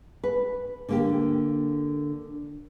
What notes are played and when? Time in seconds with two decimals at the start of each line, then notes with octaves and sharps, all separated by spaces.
0.23 B4
0.89 D3 A#3 G4